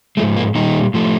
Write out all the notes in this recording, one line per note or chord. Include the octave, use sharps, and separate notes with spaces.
G#2 F3 G#3 A3
A#3
A#2 D#3 G3 D#4
A2 F3 A3